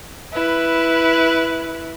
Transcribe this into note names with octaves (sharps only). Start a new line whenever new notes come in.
E4 B4